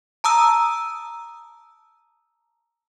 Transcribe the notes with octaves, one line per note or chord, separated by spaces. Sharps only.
A5 A#5 D#6 E6